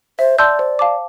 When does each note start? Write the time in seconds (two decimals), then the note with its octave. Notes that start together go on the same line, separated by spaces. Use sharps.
0.19 C5 E5
0.38 D5 A5 C6 E6 G6
0.59 C5
0.79 F5 A5 D6